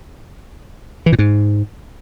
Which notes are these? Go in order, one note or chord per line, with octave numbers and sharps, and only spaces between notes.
E3
A#2
G#2